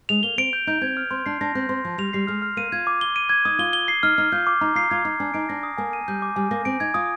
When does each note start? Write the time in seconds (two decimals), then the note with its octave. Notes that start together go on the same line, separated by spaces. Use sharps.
0.09 G#3 F7
0.23 A#3 G7
0.38 C4 D7
0.53 G6
0.67 D#4 G6
0.81 C4 G#6
0.97 F6
1.11 C4 C6
1.26 D4 C7
1.41 D4 A#6
1.55 C4 G6
1.69 C4 C6
1.84 F3 C6
1.98 G3 F7
2.13 G3 C7
2.27 G#3 F6
2.42 F6
2.57 A#3 D#7
2.72 F4 G#6
2.87 D6
3.01 G7
3.16 D#7
3.29 G#6
3.45 D#4 D#6
3.59 F4 G7
3.73 G7
3.88 C7
4.03 D#4 F6
4.18 D#4 F6
4.32 F4 G6
4.47 D6
4.61 D#4 A#5
4.75 F4 C7
4.90 F4 G#6
5.05 D#4 D6
5.20 D4 G#5
5.34 D#4 D7
5.49 D4 A#6
5.63 D#6
5.78 A#3 G#5
5.93 D#7
6.08 G3 G6
6.22 D6
6.36 G3 G#5
6.51 A#3 A#6
6.65 C4 D7
6.80 D#4 G#6
6.94 F4 D#6